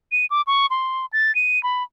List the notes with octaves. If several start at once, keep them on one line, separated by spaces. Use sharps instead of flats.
D#7
D6
C#6
C6
A6
D#7
B5